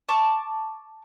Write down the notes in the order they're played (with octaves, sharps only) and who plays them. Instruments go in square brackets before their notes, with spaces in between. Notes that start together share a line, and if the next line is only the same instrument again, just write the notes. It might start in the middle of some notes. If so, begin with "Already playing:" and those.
[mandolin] A5 C#6 D6